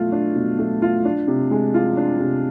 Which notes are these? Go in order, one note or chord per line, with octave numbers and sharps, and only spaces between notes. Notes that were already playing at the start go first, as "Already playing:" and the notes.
Already playing: B2 A3 F4
D4
B2
A3
F4
D4
C3
G#3
F4
D4
C3